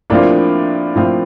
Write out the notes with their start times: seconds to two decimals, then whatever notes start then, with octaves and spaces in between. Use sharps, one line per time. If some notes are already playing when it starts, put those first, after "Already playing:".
0.10 A2 F3 A#3 C4 D4 F4
0.96 A2 F3 C4 F4